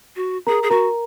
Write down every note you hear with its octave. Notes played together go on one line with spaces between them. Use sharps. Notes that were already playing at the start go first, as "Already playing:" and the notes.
F#4
G#4 A#4 A#5
G#4
F#4 A#4 A#5